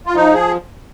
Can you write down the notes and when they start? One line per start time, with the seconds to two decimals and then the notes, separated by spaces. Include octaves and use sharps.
0.06 F4
0.15 F3 D#4
0.34 G#4